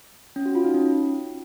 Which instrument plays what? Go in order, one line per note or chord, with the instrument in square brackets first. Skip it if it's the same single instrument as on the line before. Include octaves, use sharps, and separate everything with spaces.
[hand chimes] C#4
F#4
F4
D#4
C#4